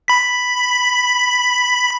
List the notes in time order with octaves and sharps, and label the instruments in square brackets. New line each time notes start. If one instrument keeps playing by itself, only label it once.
[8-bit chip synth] B5 B6